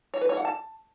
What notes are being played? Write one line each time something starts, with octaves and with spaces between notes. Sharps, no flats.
C#5
B4
C#5
F#5
A5